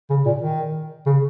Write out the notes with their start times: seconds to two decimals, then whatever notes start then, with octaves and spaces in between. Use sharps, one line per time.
0.10 C#3
0.26 A#2
0.42 D#3
1.06 C#3